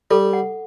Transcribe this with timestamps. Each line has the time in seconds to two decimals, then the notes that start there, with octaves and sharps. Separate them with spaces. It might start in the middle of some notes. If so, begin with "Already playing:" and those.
0.11 G3 A4
0.33 F#5